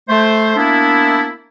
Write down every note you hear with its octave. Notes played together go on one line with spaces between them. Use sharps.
A3 C5
A#3 B3 D4 E4